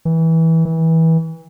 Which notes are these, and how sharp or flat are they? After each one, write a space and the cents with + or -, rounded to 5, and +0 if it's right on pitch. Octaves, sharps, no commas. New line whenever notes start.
E3 -20
E3 -25